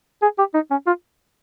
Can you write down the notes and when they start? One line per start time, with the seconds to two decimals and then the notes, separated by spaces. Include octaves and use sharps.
0.22 G#4
0.38 G4
0.54 D#4
0.71 C#4
0.87 F4